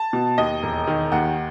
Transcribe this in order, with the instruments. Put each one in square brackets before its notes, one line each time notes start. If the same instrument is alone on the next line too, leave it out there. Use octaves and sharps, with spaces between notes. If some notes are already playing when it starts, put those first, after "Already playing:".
Already playing: [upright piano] A5
B2
D#2 D#5
E1
D#3
D#2 F#5